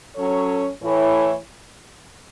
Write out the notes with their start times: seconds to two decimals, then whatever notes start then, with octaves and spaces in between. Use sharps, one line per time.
0.15 F#3 C#4 A4 C#5
0.81 A2 E3 A3 E4 C#5